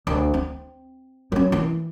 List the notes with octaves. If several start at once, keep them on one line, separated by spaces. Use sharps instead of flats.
D2
C4
F#3 C#4
E3